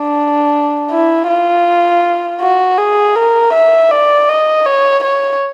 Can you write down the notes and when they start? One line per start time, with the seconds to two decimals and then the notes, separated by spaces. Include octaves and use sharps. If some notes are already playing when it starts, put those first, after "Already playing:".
Already playing: D4
0.91 E4
1.28 F4
2.41 F#4
2.78 G#4
3.15 A#4
3.53 E5
3.91 D5
4.29 D#5
4.66 C#5
5.04 C#5